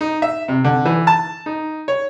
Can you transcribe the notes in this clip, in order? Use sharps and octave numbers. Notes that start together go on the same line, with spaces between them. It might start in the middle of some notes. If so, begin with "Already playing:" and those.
D#4
E5
C3
D3
E3
A5
D#4
C#5